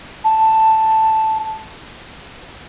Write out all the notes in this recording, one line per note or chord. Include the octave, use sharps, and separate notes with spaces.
A5